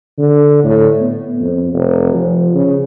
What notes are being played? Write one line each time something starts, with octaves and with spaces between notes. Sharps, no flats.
D3
A2
B3
F2
F1
F3
C#3